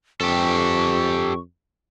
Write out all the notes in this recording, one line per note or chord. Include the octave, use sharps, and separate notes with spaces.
F2 G4 A4 C#6